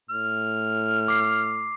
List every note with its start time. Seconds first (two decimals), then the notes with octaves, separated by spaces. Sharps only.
0.10 A2 F6
1.08 D6 C7